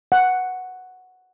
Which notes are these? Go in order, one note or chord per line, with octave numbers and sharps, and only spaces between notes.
F#5